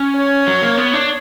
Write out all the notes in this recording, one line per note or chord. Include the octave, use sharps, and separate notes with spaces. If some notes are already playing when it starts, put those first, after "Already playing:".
Already playing: C#4
C#5
F#3
A#3
B3
D4